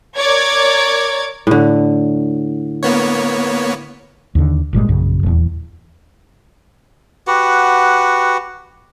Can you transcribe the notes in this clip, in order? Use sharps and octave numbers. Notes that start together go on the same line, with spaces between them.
A#4 C#5 D5 D6 G#6
A2 D3
A#3 B3 C#5
D#2 D3
G1 A#2 G3 G#3
A#1 F#2 C#3
D#1 E2
F#4 G4 B4 F#5